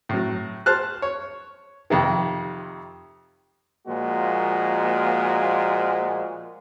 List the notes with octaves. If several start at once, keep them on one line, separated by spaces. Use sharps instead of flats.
A2 F#3
C5 A5 F6 F#6
C#5
F2 C3 D#3
A#2 F3 G#3 A#3 F#4